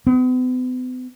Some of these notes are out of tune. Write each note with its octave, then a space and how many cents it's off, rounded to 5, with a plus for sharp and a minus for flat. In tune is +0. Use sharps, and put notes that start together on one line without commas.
B3 +45